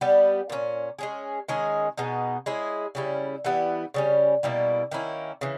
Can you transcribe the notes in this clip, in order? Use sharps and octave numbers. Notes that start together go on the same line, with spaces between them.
G3 B3 G4
A#2 A#3 C#4
G#3 C#4 G#4
D#3 G#3 C#4 G#4
B2 G#3 B3 D#4
G#3 C#4 E4 G#4
C#3 G3 C#4 E4
E3 G3 B3 E4
C#3 G3 C#4
B2 G3 A#3 E4
D#3 A#3 C#4 E4
C#3 E3